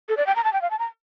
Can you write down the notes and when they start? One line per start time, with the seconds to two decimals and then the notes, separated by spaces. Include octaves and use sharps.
0.09 A4
0.17 D5
0.27 G5
0.36 A#5
0.44 A5
0.53 G5
0.62 F5
0.71 A5
0.79 A#5